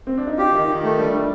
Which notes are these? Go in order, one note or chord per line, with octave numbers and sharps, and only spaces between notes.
C4
D4
D#4
F4 G4
D#3 D#4
D#3
A3
G3 D4
G3